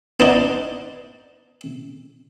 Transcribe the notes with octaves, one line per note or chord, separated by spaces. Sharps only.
B3 D4 D#4